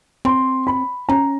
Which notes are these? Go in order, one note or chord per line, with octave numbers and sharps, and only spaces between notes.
C4 C6
B5
C#4 A#5